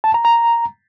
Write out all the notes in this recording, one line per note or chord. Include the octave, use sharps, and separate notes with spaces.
A5
A#5
A#5